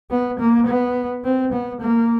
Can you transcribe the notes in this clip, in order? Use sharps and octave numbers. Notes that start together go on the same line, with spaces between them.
B3
A#3
B3
C4
B3
A#3